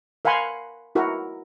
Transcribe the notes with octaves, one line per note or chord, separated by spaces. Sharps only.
A#4 F5 F#5 G#5 B5 C6
E4 F#4 A#4